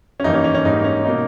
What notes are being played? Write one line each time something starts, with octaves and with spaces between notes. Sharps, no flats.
C#4
G2 E3 A#3 D#4
C#4
C#4
C#4
G#2 G3 A#3 D#4
C#4
B2 A#3 D#4